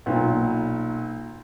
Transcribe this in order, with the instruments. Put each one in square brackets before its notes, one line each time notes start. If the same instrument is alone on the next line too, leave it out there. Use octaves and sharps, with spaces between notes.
[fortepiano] B1 A#2